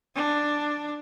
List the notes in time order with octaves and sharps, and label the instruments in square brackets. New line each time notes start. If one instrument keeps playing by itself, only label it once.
[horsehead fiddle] D4